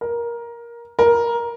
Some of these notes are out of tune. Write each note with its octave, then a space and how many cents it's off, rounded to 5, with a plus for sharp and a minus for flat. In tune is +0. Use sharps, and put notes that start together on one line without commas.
A#4 +15
A#4 +10